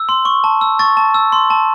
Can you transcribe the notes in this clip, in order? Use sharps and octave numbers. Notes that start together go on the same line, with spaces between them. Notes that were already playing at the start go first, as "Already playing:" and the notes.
Already playing: E6
C6
C#6
A5
E6
C#6 A6
A5
E6
C6
A5